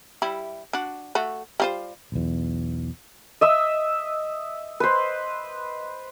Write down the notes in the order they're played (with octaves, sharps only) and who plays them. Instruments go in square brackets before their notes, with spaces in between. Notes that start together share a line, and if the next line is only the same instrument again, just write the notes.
[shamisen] G3 E4
D4 F#4
A3 F#4
G3 F4 C5
[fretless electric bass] B1 E2
[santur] D#5 E5 E6
B4 C5